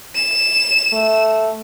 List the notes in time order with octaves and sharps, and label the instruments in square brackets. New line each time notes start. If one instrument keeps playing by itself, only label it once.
[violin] E7
[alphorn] A3